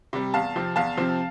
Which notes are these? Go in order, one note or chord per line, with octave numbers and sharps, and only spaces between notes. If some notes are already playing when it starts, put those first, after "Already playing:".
C3 G3
E2 F5 A5
C3 F3 C4
E2 F5 A5
C3 F3 C4